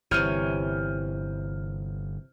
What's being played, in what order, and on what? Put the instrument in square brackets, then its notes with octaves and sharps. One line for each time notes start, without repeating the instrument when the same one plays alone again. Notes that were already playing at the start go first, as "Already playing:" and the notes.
[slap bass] G1 [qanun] C3 E3 C#5 [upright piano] F6 G6 D#7